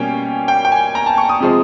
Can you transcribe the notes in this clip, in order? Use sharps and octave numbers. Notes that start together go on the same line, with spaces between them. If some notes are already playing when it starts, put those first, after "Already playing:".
Already playing: B2 G3 A#3 C#4 G5 G#5
G5
G5
G#5
A#5
A5
C#6
D#6
C3 F3 G#3